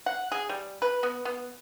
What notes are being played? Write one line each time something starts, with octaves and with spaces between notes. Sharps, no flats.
F#5
G#4
G3
B4
B3
B3